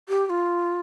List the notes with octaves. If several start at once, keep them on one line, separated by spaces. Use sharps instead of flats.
G4
G4
F4